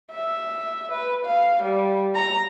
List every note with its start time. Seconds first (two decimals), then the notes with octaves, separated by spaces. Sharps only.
0.11 E5
0.92 B4
1.25 F5
1.63 G3
2.15 A#5